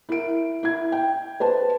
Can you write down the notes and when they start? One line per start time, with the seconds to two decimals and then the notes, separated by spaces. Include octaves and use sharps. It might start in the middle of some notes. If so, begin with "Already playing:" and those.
0.09 E4 A#4 D7
0.63 E4 G#6
0.92 G5
1.40 B4 C5 A5